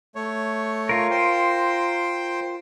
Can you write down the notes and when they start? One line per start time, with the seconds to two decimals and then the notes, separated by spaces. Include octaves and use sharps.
0.15 A3 C#5
0.89 F4 A#4
1.11 C5 G5